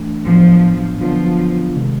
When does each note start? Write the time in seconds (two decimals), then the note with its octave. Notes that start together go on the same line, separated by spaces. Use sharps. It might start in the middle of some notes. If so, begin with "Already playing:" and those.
Already playing: E3 A3 D4
0.26 A2 F3 F#3 B3 D4
1.01 D3 F3 F#3 B3 D4 F4
1.76 C3 D#3 G#3